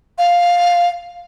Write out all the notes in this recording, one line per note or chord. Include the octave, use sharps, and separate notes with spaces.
F5